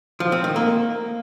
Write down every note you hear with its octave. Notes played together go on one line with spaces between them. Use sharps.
F3
C4
D#3
A#3